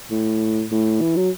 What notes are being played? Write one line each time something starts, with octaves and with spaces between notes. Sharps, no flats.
A2
A2
E3
F#3